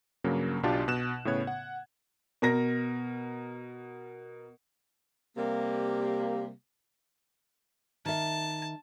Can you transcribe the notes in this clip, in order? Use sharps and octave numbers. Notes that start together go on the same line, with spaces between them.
G2 C#3 F#3 A#3
B1 B2 D4 F4 G4 A5
B2 F#6 E7
A2 C#3 B3 C#5 G#6
F#5
B2 A#4 A#6
C3 G3 A#3
D#3 E5 A5